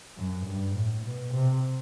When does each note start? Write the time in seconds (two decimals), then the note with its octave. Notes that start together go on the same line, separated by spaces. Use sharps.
0.17 F#2
0.46 G2
0.75 A2
1.04 B2
1.34 C3